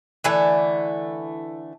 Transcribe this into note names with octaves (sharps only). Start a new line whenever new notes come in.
D3 E3 A3